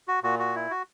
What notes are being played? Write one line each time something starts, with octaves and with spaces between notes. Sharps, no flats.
F#4
A#2 F#4
F#4
E4
F#4